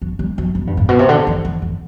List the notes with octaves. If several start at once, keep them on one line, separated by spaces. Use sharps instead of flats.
F#3
G3
F#3
E3
G2
A2
B2
C3
D3
E3
E3
E3